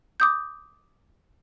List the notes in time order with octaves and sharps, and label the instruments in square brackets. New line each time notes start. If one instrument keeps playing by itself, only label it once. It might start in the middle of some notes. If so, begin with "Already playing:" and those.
[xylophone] D6 D#6 G6